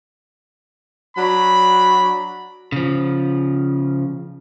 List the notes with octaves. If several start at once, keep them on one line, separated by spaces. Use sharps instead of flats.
F#3 D4 F#4 B5
C#3 F3